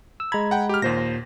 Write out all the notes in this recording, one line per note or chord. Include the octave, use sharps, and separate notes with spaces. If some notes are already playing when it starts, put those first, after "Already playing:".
E6
G#3 A#5 B5 G#6
F#5 G5
G4 F6
D#2 A#2 C5 A#6